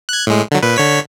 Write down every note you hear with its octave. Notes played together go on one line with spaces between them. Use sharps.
F#6 G#6
A2 G#3
D3 F#3
A#2 B4
D3 C#5 B6